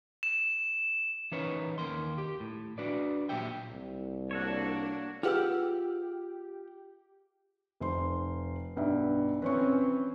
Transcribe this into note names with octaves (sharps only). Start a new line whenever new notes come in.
E7
E3 C#4 D#4 A#4 B4 C#5
D#2 A#4 C6
G4
A2
D4 F#4 B4 D5
A#2 D#3 F#3 G4 E5 G5
C2
A#3 D4 F#4 A4 C#5
F4 G4 G#4 B4 F#5 E6
F1 C5 C6
B1 G2 E5
E3 C4 C#4 B4 C#5 C#6